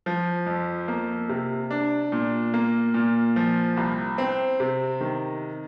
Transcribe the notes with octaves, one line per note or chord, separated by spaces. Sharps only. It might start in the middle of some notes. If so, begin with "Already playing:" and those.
F3
F2
A#3
C3
D4
A#2
A#3
A#2
F3
C2
C4
C3
D#3